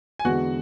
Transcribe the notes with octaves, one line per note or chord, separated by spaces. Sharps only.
G#5
E2 D3 G#3 B3 D4 F#4 F#5